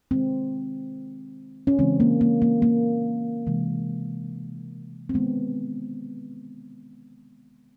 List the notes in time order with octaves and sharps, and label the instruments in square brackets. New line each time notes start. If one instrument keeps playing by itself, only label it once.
[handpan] D#3 G#3 C4
C#4
C#3 E3 G#3 C4
A#3
A#3
A#3
A#3
C3 E3 G#3
C4
D#3 G#3 B3